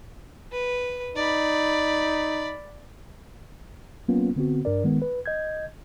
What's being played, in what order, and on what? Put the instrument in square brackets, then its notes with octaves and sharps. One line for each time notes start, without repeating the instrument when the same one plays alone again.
[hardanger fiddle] B4
[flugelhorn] D#4 [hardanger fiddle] D5 B5
[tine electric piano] F#3 A#3 B3 C#4 F4
D3 B3 C4 F#4
G2 D4 A#4 D5
D#3 G#3 B3
B4
D#5 G6 G#6